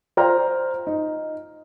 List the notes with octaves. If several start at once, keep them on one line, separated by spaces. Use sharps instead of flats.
F4 C5 D5 G5 A#5 F6
D#4